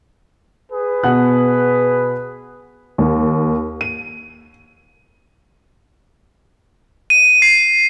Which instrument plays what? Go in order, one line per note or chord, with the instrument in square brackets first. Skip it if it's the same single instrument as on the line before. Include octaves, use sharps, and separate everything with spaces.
[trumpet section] G#4 B4
[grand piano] B2 F#5 F#6
[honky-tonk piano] D#2
D#7
[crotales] D#7
C7